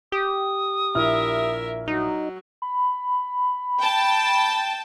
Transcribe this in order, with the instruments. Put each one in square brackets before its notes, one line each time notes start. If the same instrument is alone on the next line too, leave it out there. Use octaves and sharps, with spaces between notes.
[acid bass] G4 [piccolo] D#6
[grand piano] A#1 E4 F6 [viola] A#4 E5
[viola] F#3 [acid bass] D#4
[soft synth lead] B5
[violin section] G5 A5